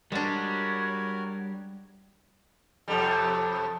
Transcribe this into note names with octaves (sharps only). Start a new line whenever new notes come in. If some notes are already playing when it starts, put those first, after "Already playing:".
G3 G#3 D4 F#4 A#4 C#5
F2 C3 G3 A4